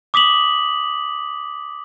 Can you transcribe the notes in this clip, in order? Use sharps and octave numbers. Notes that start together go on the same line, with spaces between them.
D6 D#6 B6 F7 F#7